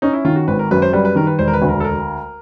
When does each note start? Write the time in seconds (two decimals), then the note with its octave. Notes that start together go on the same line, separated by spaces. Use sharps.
0.02 C#4 D#4
0.13 E4
0.25 D#3 F4
0.36 F#4
0.48 G#1 B4
0.59 A#4
0.71 F#2 B4
0.82 C5
0.93 G3 B4
1.05 B4
1.16 D#3 A#4
1.27 B4
1.39 E1 C5
1.48 A#4
1.53 B4
1.62 D2
1.69 A#4
1.80 A4
1.84 A#4